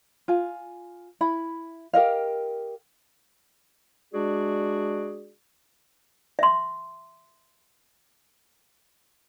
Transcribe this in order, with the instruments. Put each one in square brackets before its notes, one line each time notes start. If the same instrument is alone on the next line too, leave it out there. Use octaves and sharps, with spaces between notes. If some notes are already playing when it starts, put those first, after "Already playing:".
[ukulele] F4 G#5
E4 B5
G4 A#4 D#5 F5
[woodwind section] G#3 D4 F#4 G#4 D5
[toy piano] E5 C6